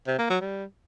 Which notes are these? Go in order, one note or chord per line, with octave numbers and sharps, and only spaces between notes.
C3
A#3
F#3
G3